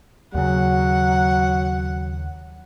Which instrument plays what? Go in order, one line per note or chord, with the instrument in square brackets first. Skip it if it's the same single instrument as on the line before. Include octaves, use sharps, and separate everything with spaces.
[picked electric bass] D#2 C#3 [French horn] F#3 [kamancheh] F#5